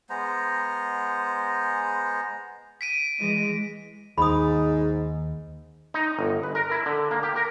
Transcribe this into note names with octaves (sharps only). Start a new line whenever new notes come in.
G#3 B3 C5 A#5
B6 D7 D#7
E3 G#3
D#2 G#2 B5 D#6
D#4
G1
B4
A#4
E4
D3
A#3
G4
A#4